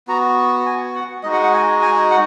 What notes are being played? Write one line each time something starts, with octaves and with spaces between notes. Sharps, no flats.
B3 F#4 A#5
G#5
F#5
G#3 D#4 F#4 D#5
F#5
F#5
G#5
G#5
F#5